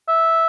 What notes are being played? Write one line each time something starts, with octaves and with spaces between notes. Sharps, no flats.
E5